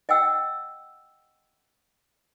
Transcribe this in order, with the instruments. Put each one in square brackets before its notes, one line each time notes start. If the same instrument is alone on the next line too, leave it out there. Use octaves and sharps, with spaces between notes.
[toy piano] D#5 F#5 G5 E6